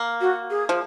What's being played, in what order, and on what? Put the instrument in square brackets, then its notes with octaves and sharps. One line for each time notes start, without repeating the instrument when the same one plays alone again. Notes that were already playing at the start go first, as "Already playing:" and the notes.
Already playing: [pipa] A#3
[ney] F#4
G#4
[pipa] F3